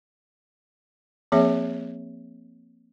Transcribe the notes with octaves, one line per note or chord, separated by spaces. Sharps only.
F3 A#3 C4 G#4 C#5 E5